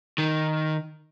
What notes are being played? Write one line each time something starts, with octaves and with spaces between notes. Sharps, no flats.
D#3